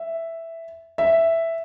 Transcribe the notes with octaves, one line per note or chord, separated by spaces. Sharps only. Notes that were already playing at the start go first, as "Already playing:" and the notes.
Already playing: E5
E5